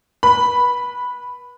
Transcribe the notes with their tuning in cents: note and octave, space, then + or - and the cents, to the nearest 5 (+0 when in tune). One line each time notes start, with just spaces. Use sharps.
B4 -35 B5 +0